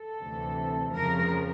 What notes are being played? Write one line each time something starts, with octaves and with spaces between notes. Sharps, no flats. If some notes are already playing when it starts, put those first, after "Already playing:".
Already playing: A4
D2 C3 E3
F2 C#3 F3 A#4